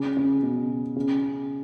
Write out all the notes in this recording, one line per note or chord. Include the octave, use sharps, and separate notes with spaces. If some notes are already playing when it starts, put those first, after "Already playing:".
Already playing: C#3
C#3
B2
C#3